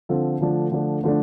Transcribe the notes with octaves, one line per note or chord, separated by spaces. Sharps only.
D3 F3 C4 F4 A4
D3 F3 A3 D4
D3 F3 A3 D4
D3 F3 A3 D4